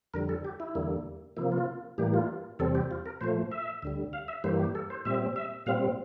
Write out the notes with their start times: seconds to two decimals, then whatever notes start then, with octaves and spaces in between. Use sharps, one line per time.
0.14 F2 D3 G3 A#4
0.29 A4
0.45 G4
0.60 E4
0.75 E2 D3 G3 A#3
1.37 C3 F3 A#3 E4
1.52 F4
1.98 A2 E3 G3 A#3 G4
2.14 F4
2.59 E2 C3 G3 C4 A4
2.75 G4
2.91 F4
3.06 A#4
3.21 A#2 F3 A3 C5
3.52 E5
3.82 D2 D3 G3
4.13 F5
4.28 E5
4.44 G2 E3 G3 A#3 C5
4.59 G4
4.75 A4
4.90 C5
5.05 A#2 G3 C4 E5
5.36 E5
5.66 A#2 G3 C4 F5